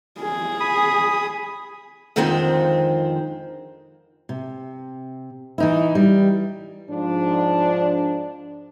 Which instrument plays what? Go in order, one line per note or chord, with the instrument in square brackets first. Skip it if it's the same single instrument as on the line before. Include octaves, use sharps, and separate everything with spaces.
[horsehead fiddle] G#4
[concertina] B5 D#6
[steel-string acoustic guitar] F2 D3 D#3 F3 G#3 C4
C3
E3 D#4 E4
G3
[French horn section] G#2 F3 D4